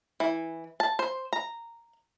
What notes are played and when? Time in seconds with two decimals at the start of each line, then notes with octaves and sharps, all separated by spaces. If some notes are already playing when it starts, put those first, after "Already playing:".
0.20 E3
0.80 A5
0.99 C5
1.33 A#5